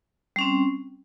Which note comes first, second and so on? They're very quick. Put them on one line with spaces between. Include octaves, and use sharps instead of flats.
G3 C#4 C4